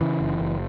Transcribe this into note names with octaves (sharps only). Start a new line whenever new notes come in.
C#3 E3
F#1
F#1